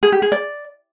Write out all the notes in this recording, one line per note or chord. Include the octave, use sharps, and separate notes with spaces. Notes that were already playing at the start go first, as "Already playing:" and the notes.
G#4
G4
G#4
D5